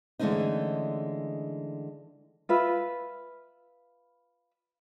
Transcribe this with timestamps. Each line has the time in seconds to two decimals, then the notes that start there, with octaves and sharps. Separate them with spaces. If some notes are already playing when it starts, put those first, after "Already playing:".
0.19 D3 E3 G#3 A3 C#4 D#4
2.49 F4 B4 E5